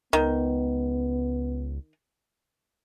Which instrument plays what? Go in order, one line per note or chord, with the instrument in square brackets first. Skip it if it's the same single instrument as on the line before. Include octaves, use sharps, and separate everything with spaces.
[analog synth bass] C#2 [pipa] D#3 [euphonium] B3